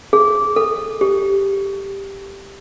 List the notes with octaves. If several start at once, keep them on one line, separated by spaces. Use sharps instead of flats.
G#4
A4
G4